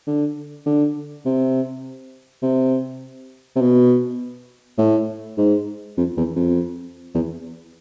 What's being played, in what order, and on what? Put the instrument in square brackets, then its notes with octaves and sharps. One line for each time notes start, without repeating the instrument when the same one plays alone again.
[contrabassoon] D3
D3
C3
C3
C3
B2
A2
G#2
F2
E2
F2
E2